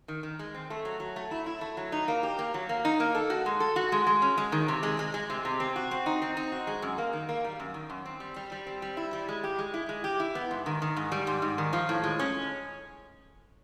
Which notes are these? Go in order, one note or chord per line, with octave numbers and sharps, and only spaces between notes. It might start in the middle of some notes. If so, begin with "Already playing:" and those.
D#3
D#3
G#3
C4
A3
F#3
F#3
A3
E4
E4
A3
F#3
D#4
A#3
G4
A#3
F#3
A#3
D#4
A#3
A4
F#4
G#3
A4
F#4
G#3
G#3
C#4
G#3
D#3
C3
G#3
G#3
G#3
C3
C3
C4
F#4
C4
D#4
C4
D#4
F#4
G#3
F#2
A#3
D#3
A#3
G3
F#2
D#3
F#2
C4
G3
G3
G3
C4
G3
E4
G3
G#3
G4
G#3
E4
G#3
G4
E4
B3
G#2
D#3
D#3
G#2
G3
G#2
G#2
D#3
F3
A2
G#3
C#4